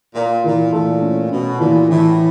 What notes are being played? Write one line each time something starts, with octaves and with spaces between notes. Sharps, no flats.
A#2 F4
A#2 E3
A#2 A3
C#4
B2 C#4
A#2 E3
A2 E3